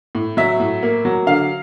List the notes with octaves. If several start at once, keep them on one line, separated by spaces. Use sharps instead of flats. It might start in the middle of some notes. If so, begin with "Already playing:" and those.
A2
F#3 E5
A2
A#3
F#3
D3 F5